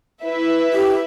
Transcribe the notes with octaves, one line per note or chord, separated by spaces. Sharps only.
E4 B4 E5
G4